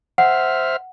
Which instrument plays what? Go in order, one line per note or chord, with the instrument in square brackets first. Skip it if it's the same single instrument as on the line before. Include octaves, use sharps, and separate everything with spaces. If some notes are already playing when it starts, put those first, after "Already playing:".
[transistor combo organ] C5 E5 F6 [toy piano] F#5